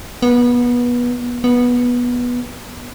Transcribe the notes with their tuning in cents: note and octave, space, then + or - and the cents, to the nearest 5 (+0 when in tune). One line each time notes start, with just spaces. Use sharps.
B3 -25
B3 -15